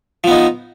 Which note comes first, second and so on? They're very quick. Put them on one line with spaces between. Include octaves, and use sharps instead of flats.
F3 B3 D#4